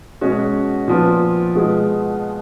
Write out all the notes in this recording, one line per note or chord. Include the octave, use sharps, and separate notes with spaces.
B2 G#3 C#4 F#4
A#2 F3 B3 F4
B2 G#3 B3 F4 G#4